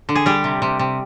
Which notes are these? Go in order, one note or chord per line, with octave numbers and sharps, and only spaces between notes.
D3
G#4
G3 G4
C3
C3
C3